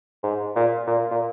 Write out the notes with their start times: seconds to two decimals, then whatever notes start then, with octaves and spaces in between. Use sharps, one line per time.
0.23 G#2
0.56 A#2
0.87 A#2
1.11 A#2